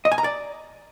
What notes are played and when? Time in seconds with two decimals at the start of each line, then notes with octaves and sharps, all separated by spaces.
0.05 D#5
0.12 G#5
0.18 A#5
0.24 D5